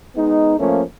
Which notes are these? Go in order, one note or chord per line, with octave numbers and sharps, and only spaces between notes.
G#3 B3 D#4
F3 A3 A#3 C#4